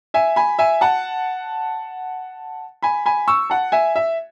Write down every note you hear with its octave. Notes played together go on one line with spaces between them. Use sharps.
E5 G#5
G#5 B5
E5 G#5
F#5 A5
G#5 B5
G#5 B5
C#6 E6
F#5 A5
E5 G#5
E5